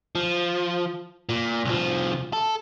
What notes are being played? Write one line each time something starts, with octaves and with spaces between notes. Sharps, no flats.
F3
A#2
C2 F3
A4